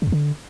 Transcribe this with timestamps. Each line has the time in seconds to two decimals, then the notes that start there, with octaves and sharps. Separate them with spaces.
0.02 C#3
0.07 E2
0.12 D3